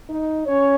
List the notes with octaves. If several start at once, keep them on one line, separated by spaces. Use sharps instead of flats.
D#4 D#5
C#4 C#5